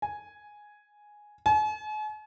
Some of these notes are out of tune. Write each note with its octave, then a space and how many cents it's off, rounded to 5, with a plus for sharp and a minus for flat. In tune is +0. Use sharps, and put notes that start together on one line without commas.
G#5 +0
G#5 +45